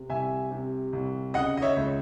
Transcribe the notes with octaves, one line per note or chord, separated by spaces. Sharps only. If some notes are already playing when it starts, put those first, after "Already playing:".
Already playing: C3
C2 E5 G#5
C3
C2
C#3 D#5 F#5
D#5
C#5 E5
C#2